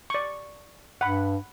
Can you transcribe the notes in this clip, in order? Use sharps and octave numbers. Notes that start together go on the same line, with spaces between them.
D5 C#6
G2 F#5 B5